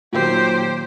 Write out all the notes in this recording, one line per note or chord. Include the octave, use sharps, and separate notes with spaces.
A#2 D#3 F#3 G4 C5